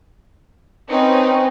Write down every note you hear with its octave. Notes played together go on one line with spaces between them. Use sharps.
C4 C#4 D#4 B4